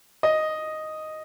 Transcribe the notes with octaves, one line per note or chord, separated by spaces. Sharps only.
D#5